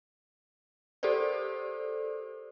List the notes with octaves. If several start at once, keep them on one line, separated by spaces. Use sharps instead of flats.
G4 A4 A#4 C5 D5